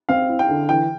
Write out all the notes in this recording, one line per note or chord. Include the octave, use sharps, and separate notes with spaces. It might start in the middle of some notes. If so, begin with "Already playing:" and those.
C4 F5
E4
G5
D3
E3 G5